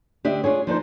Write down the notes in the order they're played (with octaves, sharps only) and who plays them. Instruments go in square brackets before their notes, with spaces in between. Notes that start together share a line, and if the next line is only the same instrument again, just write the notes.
[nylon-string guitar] D2 D4 G4 D#5 E5
D4 F4 G#4 C#5
F3 D4 D#4 C5